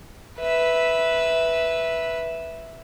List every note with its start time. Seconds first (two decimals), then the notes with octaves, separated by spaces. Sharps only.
0.39 B4 E5